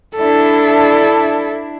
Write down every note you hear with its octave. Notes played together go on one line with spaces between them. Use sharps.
D4 E4 A4